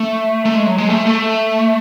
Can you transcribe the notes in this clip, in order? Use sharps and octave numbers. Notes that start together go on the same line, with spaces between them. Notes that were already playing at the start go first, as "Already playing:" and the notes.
Already playing: A3
A3
G#3
F#3
G#3
A3
A3